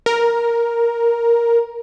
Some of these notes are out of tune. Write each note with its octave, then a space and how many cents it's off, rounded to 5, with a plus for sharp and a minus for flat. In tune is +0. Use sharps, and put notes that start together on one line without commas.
A#4 +5